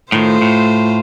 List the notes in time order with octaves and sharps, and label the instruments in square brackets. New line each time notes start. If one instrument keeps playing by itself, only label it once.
[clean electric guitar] A2 D#3 [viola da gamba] A3 F4 C5
[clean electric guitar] A2